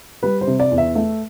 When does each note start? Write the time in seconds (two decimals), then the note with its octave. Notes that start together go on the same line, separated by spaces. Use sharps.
0.23 G3 B4
0.41 C5
0.47 C3
0.60 D5
0.71 E2
0.78 E5
0.95 A3 E5